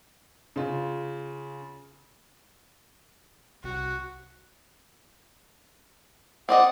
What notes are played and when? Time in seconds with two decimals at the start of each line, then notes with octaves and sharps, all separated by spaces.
0.56 C#3 F4
3.64 C2 F#4
6.49 C4 D5 D#5 F#5